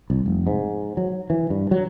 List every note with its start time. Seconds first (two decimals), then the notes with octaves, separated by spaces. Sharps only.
0.10 C2
0.26 F1
0.47 G#2
0.97 F#3
1.30 E3
1.50 G2
1.71 F#3